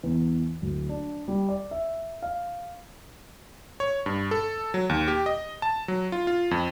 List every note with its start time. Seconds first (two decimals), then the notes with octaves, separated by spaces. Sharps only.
0.03 E2
0.62 D1
0.89 D4
1.28 G3
1.49 D5
1.71 E5
2.23 F5
3.80 C#5
4.06 G2
4.31 A4
4.74 F#3
4.90 D#2
5.08 G4
5.26 D#5
5.62 A5
5.88 F#3
6.12 F4
6.27 F4
6.51 F2